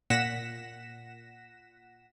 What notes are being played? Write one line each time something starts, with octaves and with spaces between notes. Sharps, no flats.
A#2 F#5 A#6 B6 E7